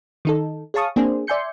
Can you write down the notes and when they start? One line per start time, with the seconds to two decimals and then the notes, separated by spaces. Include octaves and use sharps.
0.25 D#3 D#4 A4
0.74 G#4 C#5 F5 A5 C#6 D#6
0.96 A#3 C4 D4 G#4 C5
1.27 D5 E5 G#5 C6 G6 C#7